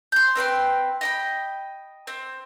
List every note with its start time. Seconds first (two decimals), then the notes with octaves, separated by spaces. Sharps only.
0.12 C6 G6
0.35 C4 B4 G5 C6
1.01 D#5 G5 B5
2.07 C4